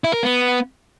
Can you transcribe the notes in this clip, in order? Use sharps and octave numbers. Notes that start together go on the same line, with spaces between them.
E4
A#4
B3